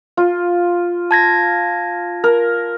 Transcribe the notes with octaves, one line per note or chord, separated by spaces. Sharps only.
F4
A5 G#6 A#6
A#4